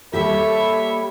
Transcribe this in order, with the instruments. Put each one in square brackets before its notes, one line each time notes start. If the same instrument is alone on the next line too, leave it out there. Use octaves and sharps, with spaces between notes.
[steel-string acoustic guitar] G3 A#3 G4 [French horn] A4 [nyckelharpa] C#5 E5 [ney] B5